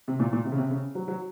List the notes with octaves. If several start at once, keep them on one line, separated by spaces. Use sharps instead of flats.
C3
A#2
A#2
C3
C#3
C3
C#3
F#3
F#3